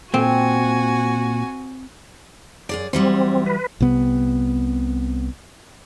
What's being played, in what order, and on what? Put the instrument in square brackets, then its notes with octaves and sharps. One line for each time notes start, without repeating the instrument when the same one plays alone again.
[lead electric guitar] A#2 [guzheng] C4 [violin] F#4 G#5
[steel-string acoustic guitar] F#2 G#4 D5
[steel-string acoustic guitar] E3 F#3 G3 [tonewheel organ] C4
[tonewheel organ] B4
[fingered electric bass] C2 C3 B3